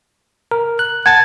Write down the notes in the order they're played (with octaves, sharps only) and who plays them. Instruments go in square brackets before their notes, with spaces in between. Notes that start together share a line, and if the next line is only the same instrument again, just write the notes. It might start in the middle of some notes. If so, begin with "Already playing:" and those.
[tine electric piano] A#4
F#6
[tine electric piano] F#5 A5 A6 [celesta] G#6